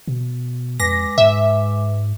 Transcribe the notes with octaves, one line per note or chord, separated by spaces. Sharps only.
B2
F2 G#3 B4 D6 A#6
G#2 E5